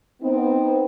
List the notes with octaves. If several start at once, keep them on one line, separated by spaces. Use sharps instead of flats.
B3 C4 D#4